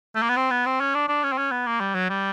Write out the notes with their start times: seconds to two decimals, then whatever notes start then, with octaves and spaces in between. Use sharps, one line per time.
0.15 A3
0.22 A#3
0.29 B3
0.37 C4
0.51 B3
0.66 C4
0.80 C#4
0.95 D4
1.08 D4
1.24 C#4
1.32 C4
1.38 C#4
1.51 B3
1.66 A#3
1.80 G3
1.95 F#3
2.10 G3